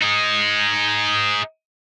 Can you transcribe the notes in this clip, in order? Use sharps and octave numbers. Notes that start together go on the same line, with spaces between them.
D#4 G#4